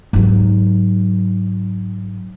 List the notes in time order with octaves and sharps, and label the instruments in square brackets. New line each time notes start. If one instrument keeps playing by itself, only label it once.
[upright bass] G#2 F#3